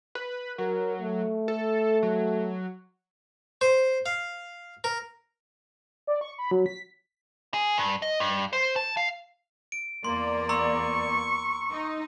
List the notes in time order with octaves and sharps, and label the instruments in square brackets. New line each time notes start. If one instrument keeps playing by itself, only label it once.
[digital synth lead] B4
[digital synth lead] F#3 [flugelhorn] A#4
[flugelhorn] A3
[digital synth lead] A4
F#3
[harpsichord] C5
F5
A#4
[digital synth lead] D5
C#6
B5
F#3
B6
[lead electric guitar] G#4
G2
D#5
G2
C5
A5
F5
[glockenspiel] D7
[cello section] E2 A#3 D5 [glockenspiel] C6
[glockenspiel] A#5 C6 E6 [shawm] C#6
[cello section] D#4